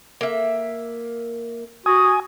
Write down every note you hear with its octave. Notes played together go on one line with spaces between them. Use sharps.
A#3 E5
F#4 G#5 D#6